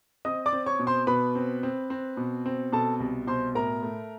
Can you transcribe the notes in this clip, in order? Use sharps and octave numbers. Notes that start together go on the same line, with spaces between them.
C4 D#5 D#6
D5 D6
C4
C#5 C#6
B2
C5 C6
B2 B4 B5
C4
C4
C4
B2
C4
B2 A4 A5
C2
B2 C5 C6
A2 A#4 A#5
A3